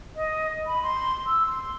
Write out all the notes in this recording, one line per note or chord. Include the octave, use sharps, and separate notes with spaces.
D#5
B5
C6
E6
C6